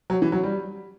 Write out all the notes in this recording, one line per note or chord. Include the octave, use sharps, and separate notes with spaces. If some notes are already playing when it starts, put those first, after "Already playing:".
F#3
E3
F#3
G3